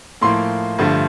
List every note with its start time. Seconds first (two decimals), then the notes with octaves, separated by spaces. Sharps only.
0.21 A2 F3 A#3 C6
0.78 G2 D3 F3 A3